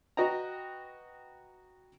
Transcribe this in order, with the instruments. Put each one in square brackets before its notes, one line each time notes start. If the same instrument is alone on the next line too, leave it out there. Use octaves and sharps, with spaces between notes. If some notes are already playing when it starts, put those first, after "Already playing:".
[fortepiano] F#4 B4 D#5 G5 A#5